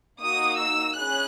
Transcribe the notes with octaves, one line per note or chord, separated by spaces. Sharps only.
A#3 D#4 F#4 D#6
E6
C#4 E4 G#4 F#6